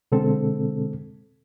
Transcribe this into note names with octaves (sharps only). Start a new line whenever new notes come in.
B2 D3 G#3 C4 A4